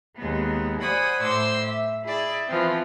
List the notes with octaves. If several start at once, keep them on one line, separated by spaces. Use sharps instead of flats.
D#2 G#3 B3
C5 D5 F#5 G#5 B5 D#6
A2 C5 C6 D6 E6
E5
E4 G#4 D5 E5
E3 F3 B3 C4